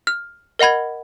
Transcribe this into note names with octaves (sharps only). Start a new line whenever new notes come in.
F6
A#4 D#5 F#5 B5 G#6